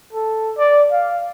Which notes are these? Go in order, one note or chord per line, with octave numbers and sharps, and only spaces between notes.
A4
D5
F5